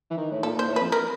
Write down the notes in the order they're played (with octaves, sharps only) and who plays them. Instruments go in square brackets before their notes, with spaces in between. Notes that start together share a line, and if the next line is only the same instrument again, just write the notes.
[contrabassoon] E3
D#3
A2
[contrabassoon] A#2 [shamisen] A4
[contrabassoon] A#2 [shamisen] C5
[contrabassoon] A2
[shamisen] B4
[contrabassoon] F2
[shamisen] A#4